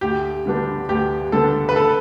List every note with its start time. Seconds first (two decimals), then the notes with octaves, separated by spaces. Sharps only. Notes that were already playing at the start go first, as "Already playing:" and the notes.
0.01 D2 G4
0.46 D3 G3 B3 D4
0.89 D2 G4
1.32 D3 G3 B3 D4 A4
1.69 B4
1.76 A4